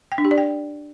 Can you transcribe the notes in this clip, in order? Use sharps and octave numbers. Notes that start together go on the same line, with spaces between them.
G5
D4
G4
D5
G5